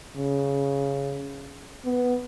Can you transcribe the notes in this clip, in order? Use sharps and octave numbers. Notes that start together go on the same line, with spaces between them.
C#3
B3